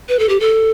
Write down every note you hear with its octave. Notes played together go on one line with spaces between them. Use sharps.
B4
A4
G4
A4